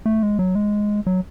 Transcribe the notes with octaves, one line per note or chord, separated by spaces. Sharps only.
A3
G#3
F#3
G#3
F#3